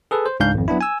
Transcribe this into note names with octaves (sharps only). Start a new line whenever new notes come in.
G#4 A4 B4
C5
C#2 G#2 D4 F5 G6
G#1 F2
F#3 B3 D4 E4
G#5 E6